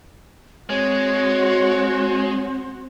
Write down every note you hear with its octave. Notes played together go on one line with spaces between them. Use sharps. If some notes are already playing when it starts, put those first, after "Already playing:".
G#3 C4 F#4 C#5